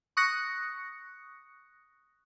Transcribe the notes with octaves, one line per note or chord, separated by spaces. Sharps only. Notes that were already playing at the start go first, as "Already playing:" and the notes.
C#6 D#6 F#6 A#6 C#7